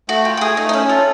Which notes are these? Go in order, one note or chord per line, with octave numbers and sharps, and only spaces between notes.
A3 F#4
F4 G4
G4
A3 G#4
A3 D#4
D#4
C#4 E4
F4 A4